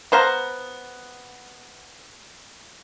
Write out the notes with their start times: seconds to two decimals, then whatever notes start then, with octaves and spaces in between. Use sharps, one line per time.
0.12 B3 C5 F5 A#5